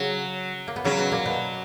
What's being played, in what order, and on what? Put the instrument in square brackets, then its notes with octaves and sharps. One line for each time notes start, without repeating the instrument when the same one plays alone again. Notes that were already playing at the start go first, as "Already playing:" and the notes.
Already playing: [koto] C#3 C#4 [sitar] F#3
[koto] A#3
B3
[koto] C#3 C#4 [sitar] F#3
[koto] B2 B3
A#2 A#3
B2 B3